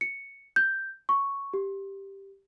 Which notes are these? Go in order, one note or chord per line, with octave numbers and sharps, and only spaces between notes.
C#7
G6
C#6
G4